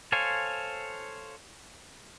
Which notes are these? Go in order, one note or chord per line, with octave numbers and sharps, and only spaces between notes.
A4 C5 C#5 F5 G#5